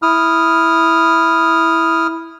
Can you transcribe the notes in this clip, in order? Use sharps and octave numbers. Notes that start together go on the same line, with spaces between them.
E4 D#6 F6